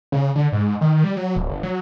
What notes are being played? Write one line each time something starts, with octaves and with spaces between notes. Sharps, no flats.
C#3
D3
G#2
D#3
G3
F#3
D1
G1
F#3